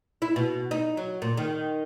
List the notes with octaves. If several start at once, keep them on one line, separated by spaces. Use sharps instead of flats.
E4
B2
D#4
F#3
A#2
D#3